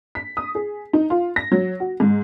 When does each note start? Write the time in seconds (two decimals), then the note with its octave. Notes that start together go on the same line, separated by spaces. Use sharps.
0.15 B6
0.37 D#6
0.55 G#4
0.93 D#4
1.10 F4
1.36 A#6
1.52 F#3
1.80 F#4
2.00 G#2